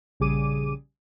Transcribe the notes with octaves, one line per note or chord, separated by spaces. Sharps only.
A#1 C#3 G3 G#4 D6 D#7